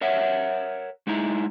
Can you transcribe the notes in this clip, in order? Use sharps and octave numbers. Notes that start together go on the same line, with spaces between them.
A#4 C#5 E5 F#5
G#3 D#4 E4 A#5